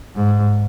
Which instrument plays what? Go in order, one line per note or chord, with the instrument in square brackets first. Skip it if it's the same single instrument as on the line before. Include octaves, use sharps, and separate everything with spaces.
[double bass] G#2